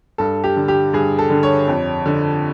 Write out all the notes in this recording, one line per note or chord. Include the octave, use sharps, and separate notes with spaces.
G2 A4
G4
D3
G4
G2 G#4
A4
D3
C#5
F2
D3